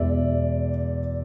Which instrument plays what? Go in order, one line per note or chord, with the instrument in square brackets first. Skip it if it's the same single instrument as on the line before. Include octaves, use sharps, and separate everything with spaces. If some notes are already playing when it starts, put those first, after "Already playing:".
Already playing: [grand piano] E2 B2 G#3 D5 E5